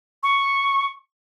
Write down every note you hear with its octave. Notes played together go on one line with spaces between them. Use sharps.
C#6